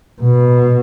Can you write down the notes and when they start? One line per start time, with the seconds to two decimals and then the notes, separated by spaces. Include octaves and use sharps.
0.21 B2